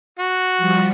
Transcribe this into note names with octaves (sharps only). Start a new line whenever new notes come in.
F#4
F3 G3